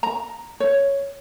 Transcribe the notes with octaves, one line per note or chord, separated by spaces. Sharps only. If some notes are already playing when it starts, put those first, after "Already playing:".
A#5
C#5